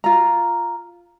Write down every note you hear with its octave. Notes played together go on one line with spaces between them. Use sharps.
F4 A#5